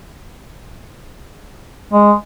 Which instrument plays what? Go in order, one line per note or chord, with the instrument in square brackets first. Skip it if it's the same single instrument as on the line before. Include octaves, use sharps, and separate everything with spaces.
[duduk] G#3